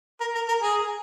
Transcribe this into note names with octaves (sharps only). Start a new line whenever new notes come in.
A#4
A#4
A#4
G#4